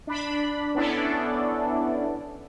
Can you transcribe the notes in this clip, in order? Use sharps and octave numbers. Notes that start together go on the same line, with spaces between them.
D4 B5
B3 C#4 D4 E4 A4 D5